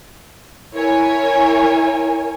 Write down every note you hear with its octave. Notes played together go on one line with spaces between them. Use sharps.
E4 A#4 C#5 G#5